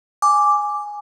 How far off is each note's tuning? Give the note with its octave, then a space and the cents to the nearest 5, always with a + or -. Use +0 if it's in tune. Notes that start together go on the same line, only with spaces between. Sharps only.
G#5 +0 D6 +0